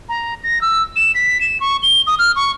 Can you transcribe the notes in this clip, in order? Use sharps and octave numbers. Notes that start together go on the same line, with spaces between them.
A#5
A#6
E6
E7
B6
E7
C#6
G7
D#6
F6
C#6